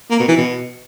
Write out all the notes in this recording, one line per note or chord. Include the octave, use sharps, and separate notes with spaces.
A#3
B2
E3
B2